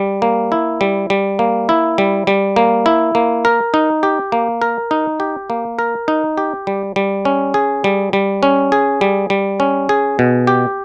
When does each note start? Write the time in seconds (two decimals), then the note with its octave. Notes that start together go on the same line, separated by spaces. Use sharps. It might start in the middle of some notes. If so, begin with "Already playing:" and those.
Already playing: G3
0.22 A#3
0.52 E4
0.81 G3
1.10 G3
1.39 A#3
1.69 E4
1.98 G3
2.27 G3
2.56 A#3
2.86 E4
3.15 A#3
3.45 A#4
3.74 D#4
4.03 G4
4.32 A#3
4.62 A#4
4.91 D#4
5.20 G4
5.50 A#3
5.79 A#4
6.08 D#4
6.38 G4
6.67 G3
6.96 G3
7.25 C#4
7.54 G#4
7.84 G3
8.13 G3
8.43 C#4
8.72 G#4
9.01 G3
9.30 G3
9.60 C#4
9.89 G#4
10.19 B2
10.47 G4